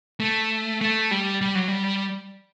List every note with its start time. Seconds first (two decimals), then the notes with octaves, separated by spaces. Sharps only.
0.20 A3
0.81 A3
1.11 G3
1.41 G3
1.55 F#3
1.68 G3